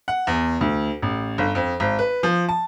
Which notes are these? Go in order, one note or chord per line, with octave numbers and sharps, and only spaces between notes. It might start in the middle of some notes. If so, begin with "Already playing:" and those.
F#5
E2
D2
A1
G1
F2
G#1
B4
F3
A5